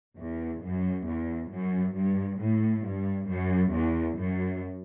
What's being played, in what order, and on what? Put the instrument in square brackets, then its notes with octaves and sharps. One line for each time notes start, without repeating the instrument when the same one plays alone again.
[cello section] E2
F#2
E2
F#2
G2
A2
G2
F#2
E2
F#2